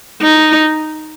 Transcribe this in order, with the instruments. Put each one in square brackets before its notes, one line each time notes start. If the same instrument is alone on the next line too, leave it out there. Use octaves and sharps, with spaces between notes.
[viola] D#4